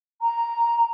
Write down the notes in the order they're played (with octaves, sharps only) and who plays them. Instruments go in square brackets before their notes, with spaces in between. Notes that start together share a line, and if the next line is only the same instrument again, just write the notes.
[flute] A#5